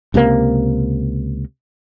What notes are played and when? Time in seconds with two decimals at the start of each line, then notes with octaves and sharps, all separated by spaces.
0.14 C#2 C3 D#3 A#3